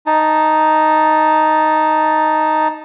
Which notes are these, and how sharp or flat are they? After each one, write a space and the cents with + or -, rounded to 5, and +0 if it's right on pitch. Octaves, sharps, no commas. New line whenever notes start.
D#4 +0 A5 +0